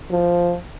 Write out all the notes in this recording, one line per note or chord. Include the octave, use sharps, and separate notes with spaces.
F3